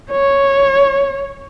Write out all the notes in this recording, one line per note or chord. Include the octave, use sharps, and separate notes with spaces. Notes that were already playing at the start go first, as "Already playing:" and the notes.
C#5